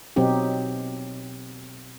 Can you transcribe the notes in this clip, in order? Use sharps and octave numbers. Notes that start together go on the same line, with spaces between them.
B2 F#3 C4 D#4 G4